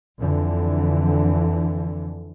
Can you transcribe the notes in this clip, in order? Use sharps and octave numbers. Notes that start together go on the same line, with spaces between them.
F2 D3 E3